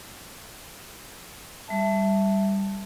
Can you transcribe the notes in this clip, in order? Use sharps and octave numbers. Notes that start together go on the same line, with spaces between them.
G3 E5 A5